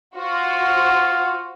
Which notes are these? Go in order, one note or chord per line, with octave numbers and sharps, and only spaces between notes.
F4 F#4 C5